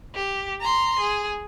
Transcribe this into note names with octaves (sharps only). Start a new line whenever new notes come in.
G4
A#5 C6
G#4